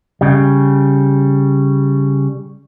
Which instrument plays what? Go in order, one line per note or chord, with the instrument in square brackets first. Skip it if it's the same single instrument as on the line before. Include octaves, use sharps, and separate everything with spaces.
[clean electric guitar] C#3 G3